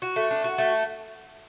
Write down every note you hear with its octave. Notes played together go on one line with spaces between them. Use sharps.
F#4
A3
D4
F#4
A3